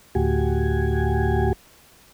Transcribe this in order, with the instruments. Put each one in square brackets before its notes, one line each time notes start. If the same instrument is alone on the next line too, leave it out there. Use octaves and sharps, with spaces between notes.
[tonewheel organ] D2 A2 F#4 G4 G#5